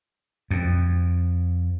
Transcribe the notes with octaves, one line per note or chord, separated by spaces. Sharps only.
F2